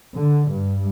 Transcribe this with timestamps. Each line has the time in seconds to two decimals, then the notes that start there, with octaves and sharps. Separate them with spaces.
0.17 D3
0.50 G2